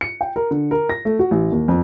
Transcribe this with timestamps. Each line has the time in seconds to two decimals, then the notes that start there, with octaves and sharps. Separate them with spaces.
0.01 C#7
0.21 G5
0.36 A#4
0.51 D3
0.71 A#4
0.89 A#6
1.05 A3
1.19 F#4
1.31 A1
1.52 D#2
1.68 F2